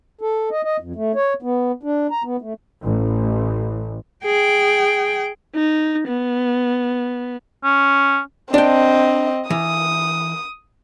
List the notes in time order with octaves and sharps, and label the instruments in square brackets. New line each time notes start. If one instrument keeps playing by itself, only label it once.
[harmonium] A4
D#5
D#5
F2
A3
C#5
B3
D4
A#5
B3
A3
[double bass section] A1
[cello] G#4 G5
[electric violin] D#4
B3
[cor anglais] C#4
[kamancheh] C4 D#5 [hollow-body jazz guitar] D4 G5
[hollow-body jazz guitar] E3 [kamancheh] D#6